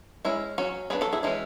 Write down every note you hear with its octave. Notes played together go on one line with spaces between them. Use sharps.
G#3 C#4 E4
F#3 C#4 F#4
F#3 B3 D4 G#4 B4
F#4 A4
E4 G#4
E3 G#3 C#4 E4